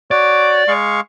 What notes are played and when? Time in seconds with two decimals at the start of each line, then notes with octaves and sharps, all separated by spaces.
0.11 F#4 C#5 D5
0.68 G#3 F5 C#6